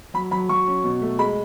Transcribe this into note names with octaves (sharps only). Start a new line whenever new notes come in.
F#3 B5
F#3 B5
F#3 C#6
C#4
B2
A3
G#3 B5